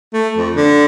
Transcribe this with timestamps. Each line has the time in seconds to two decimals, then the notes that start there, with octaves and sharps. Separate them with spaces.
0.14 A3
0.37 F2
0.56 D3